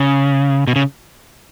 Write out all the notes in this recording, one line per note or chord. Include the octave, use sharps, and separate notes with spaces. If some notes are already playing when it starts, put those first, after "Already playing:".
Already playing: C#3
B2
C#3